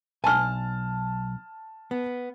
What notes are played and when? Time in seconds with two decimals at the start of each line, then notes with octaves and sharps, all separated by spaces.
0.24 B1 G#5 A5 F6
1.91 B3